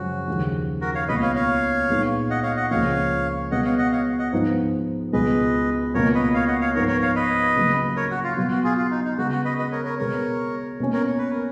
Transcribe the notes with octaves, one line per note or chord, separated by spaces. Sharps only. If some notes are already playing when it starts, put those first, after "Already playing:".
Already playing: F#2 C#3 F3 G#3 C#4 F#4
D#2 C#3 F3 G#3
F#4 A#4
C#5 F5
C#2 B2 A#3 B4 D#5
C#5 F5
C#5 F5
A#2 G#3 B3 D#4
D#5 F#5
C#5 F5
D#5 F#5
C#2 C#3 F3 A#3 C#5 F5
B2 G#3 B3 D#5 F#5
C#5 F5
D#5 F#5
C#5 F5
D#5 F#5
G#2 F3 B3 D#4
C#2 B2 G#3 B4 D#5
C#2 B2 A#3 A#4 C#5
B4 D#5
C#5 F5
D#5 F#5
C#5 F5
G#2 F3 B3 D#4 A#4 C#5
A#4 C#5
C#5 F5
B4 D#5
C#3 F#3 A#3
A#4 C#5
F#4
F4
B2 F#3 B3 F4
F#4
F4 G#4
F4
D#4
D#4
C#3 G#3 B3 F#4
F#4
B4 D#5
B4 D#5
A#4 C#5
A#4 C#5
B2 G#3 B3 A#4 C#5
B2 A#3 C#4
A#4 C#5
C#5
B4
A#4